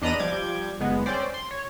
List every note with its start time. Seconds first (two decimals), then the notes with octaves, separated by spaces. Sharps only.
0.02 E2 D4 D#5 A#5 B5 D#7
0.20 F3 G3 D6 G6 G#6
0.80 G1 G#3 B3
1.06 C4 C#4 C5 D5
1.34 C6
1.51 C#5